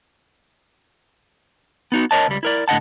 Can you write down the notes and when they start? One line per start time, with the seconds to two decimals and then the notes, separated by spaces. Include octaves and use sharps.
1.92 B3 D#4 F#4
2.11 A#4 C#5 D#5 A5
2.28 C#2 G3
2.43 E4 A#4 D5
2.68 A2 D3 D#5 F#5 A5